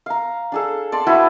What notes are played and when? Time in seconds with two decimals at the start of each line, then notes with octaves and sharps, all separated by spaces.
0.06 F5 A#5
0.52 D4 G#4 A4
0.92 D5 A5 C6
1.07 E4 F#4 B4 G5